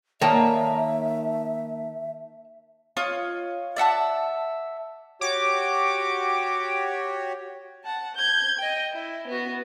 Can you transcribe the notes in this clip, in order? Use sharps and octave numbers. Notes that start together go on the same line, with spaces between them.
D#3 A#3 C#5 D#5 E5 G5 A5
F4 C#5 D#5
D5 E5 F#5 A5
F#4 G4 C#5 D6
F#5 A5
G6 G#6
D#5 G5
E4
B3 F#4